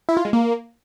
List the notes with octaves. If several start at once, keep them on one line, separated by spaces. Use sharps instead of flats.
E4
F4
G#3
A#3